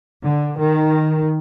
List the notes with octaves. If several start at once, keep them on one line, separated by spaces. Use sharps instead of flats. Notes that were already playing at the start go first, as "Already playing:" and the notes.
D3
D#3